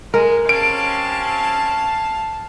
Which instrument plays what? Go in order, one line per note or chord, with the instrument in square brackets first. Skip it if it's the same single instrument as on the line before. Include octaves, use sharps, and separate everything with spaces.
[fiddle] G#3 [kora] A#4
[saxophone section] C3 C4 C#4 [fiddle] F5 A5 [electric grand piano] D7